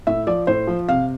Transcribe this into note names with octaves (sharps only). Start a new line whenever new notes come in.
A2 E5
F3 D5
A2 C5
F3
C3 F5